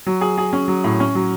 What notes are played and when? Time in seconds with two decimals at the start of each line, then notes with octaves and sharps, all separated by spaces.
0.06 F#3
0.21 G#4
0.38 G#4
0.53 C#4
0.68 F#3
0.84 A2
1.00 C#4
1.15 F#3